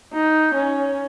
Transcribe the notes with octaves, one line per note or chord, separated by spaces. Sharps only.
D#4
C#4